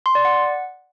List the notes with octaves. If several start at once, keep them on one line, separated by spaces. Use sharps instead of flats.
C6
D5
F#5